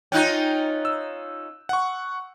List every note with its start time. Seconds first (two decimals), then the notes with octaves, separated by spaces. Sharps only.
0.12 C#4 D#4 F4 G5 F#6 G6
0.85 E6
1.69 F#5 C#6